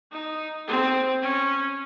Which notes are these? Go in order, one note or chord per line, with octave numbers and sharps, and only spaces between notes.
D#4
C4
C#4